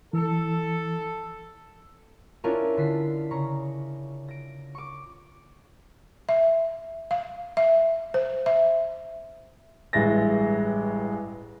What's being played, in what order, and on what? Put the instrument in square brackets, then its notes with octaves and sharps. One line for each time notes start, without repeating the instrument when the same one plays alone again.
[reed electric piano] E3 [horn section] A4
[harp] C#4 D4 E4 F4 A4 A#4
D3 B6 C7
C#3 A#5 C#6
A#6 D7
C#6 D6
[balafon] E5
F5
E5
C5
E5
[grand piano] A1 G2 G#3 E5 A6 A#6